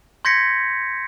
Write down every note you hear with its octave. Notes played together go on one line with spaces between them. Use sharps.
C6 G6 G#6 A#6 B6 C#7